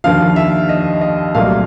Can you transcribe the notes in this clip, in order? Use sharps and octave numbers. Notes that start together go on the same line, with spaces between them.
D#2 D3 F3 F5
E5
D#5
D#5
C2 A#2 F#3 A3 F5